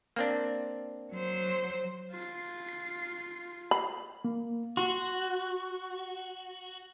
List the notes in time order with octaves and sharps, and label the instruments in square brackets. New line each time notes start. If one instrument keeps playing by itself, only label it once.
[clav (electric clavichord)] A#3 C4 D4
[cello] F#3 C5
[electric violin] F4 C7
[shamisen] B5
[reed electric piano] A#3
[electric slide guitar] F#4 [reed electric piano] C6